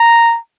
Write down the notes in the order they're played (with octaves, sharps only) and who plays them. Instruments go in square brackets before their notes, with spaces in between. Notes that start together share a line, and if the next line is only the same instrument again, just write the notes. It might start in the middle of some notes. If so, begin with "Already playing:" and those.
Already playing: [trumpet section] A#5